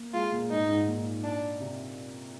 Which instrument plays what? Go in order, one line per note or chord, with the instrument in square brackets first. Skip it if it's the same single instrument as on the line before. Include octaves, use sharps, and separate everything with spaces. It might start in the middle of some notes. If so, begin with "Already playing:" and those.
Already playing: [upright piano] A#3
[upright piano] G#3 [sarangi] F4
[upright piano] A#2
[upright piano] G#2 [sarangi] D#4
[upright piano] G#2
A#2
[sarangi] D4
[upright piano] C3